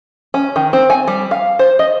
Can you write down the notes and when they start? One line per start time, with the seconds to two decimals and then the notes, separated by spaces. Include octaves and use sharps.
0.34 C#4
0.56 D#3
0.73 C4
0.90 G#5
1.07 G3
1.31 F5
1.59 C5
1.79 D#5